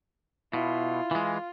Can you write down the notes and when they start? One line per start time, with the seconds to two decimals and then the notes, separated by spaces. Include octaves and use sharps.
0.53 B2 E4 F4
1.11 E3 G#3